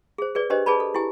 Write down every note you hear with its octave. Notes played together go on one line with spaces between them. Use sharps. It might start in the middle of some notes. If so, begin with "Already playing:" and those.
G#4 C5
G#4 B4 D5
D4 G4 B4 C5 D#5
G#4 B4 D5 A5 B5
A4
E4 G4 G#5